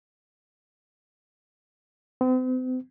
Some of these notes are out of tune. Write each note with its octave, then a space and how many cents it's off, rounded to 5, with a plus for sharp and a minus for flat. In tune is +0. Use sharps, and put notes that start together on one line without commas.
C4 -40